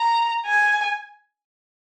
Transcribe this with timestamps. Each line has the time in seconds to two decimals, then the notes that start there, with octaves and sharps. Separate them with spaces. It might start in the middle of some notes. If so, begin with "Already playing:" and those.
Already playing: A#5
0.45 G#5